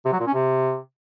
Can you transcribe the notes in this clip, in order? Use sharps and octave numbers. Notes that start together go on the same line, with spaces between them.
C3
F#3
A#2
C#4
C3